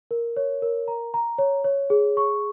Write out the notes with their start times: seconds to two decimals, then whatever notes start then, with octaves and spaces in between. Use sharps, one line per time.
0.11 A#4
0.37 C#5
0.62 A#4
0.88 A#5
1.14 A#5
1.39 C#5
1.64 C#5
1.90 G#4
2.17 C#6